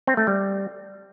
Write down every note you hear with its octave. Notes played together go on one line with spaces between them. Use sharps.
C4
A3
G3